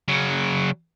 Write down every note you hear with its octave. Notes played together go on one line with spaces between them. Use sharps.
C#3 F#3